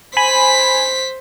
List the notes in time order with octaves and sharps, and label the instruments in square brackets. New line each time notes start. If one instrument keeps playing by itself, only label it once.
[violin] C5 B6 [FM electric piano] G#5 B5